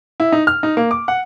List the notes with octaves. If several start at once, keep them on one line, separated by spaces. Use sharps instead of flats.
E4
D#4
F6
D#4
A#3
D6
F#5